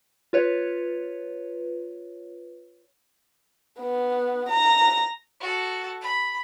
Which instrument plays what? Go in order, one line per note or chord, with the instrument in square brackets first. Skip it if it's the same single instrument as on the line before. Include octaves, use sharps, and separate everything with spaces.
[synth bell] F4 B4 C#5
[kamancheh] B3
A#5
[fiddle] F#4 A4
B5